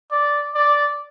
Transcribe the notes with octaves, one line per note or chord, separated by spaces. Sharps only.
D5
D5